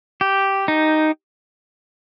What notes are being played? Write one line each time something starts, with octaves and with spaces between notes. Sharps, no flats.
G4
D#4